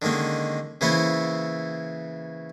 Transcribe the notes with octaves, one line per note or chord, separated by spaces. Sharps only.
D3 D#3 G#3 A#3 C#4
C#3 E3 A#3 E4 C5 C#5